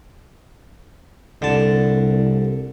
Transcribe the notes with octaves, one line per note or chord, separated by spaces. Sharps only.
C2 D3 A5